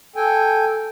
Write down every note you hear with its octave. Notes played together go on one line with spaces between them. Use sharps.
A4 G5 G#5